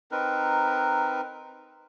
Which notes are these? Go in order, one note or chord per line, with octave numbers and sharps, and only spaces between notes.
C4 D#4 A#4 B4